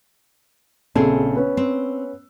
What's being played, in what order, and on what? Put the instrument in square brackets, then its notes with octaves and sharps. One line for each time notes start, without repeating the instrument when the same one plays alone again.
[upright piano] A#1 C#3 A4 [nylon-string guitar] C4 G#4
[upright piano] B3 C#4
[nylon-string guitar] C4